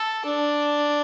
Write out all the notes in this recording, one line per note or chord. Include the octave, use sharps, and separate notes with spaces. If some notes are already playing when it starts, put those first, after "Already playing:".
Already playing: A4
D4